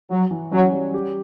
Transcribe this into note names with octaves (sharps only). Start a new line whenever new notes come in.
F#3 F#4
E3
F#3 C#4
G3
G4